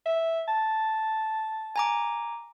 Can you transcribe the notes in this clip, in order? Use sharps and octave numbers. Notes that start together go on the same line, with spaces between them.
E5
A5
G#5 A#5 D6